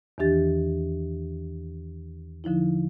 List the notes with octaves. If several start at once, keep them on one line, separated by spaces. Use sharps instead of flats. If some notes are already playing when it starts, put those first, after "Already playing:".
E2 D#3 E3 D4 G4 A6
D3 F3 D#4 E4